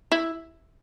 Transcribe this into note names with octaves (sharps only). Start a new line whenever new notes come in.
E4